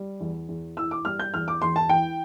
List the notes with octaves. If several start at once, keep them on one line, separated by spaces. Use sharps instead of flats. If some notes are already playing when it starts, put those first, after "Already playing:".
Already playing: G3
E2
E2
E3 E6
D6
G3 F6
G6
E2 F6
D6
E2 C6
A5
E3 G5